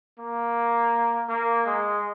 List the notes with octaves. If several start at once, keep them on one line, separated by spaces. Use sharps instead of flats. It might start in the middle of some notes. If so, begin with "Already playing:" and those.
A#3
A#3
G#3